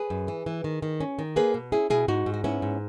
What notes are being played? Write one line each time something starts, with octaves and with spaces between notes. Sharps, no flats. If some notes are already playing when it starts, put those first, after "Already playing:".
Already playing: G#4 B4
F#2
E3
E3
D#3
D#3
C#4
D#3
A#3 G#4 B4
B2
C#4 E4 G#4
B2 E4 G#4
G#2 D#4 F#4
G#2
F#4
B3 C#4 E4
G#2